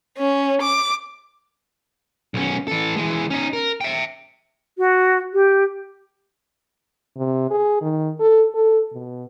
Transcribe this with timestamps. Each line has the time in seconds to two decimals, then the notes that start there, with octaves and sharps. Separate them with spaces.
0.18 C#4
0.62 D6
2.34 B1 C#4
2.68 E3 A4
2.96 E3 G#3
3.30 C#4 D#4
3.53 A#4
3.81 E5 G5
4.78 F#4
5.33 G4
7.17 C3
7.51 G#4
7.82 D#3
8.20 A4
8.55 A4
8.93 B2